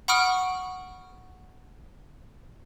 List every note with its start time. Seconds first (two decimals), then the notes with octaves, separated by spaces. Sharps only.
0.08 F#5 B5 C#6 D#6 F6 D7